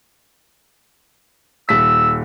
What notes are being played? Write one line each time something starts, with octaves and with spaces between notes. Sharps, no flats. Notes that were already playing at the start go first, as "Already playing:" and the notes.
D#1 E6 B6